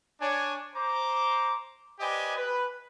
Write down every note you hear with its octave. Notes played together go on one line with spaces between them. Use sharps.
D4 C#5 G#5
C5 A#5 D6
G4 B4 C5 D5 D#5 G#5
B4